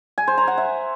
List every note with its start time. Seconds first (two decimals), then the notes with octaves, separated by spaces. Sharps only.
0.18 G#5
0.28 C5
0.38 A#5
0.48 F#5
0.58 E5